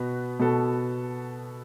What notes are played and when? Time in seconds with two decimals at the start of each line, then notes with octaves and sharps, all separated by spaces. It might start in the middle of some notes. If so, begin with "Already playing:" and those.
Already playing: B2 B3 F#4
0.39 B2 B3 F#4 A4